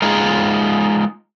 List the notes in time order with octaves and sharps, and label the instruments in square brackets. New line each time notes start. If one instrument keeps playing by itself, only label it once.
[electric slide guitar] G#3 D#4 F4 G#4